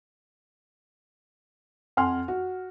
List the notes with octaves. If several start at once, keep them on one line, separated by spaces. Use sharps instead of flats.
F2 F#5 G#5 C6 F6
F#4